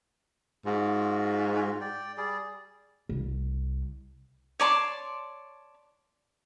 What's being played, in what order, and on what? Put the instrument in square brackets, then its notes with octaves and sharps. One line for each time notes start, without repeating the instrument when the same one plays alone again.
[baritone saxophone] G#2 [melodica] F4 F#4
[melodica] D5 G5
G3 G#4 D5
[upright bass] C2
[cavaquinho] C#5 D5 A5 C6